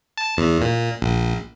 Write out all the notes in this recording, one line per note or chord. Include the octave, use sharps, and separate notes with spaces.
A5
E2
A#2
A#1